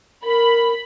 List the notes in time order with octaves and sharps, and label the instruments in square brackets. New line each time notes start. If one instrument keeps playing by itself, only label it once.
[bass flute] A#4 [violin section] B5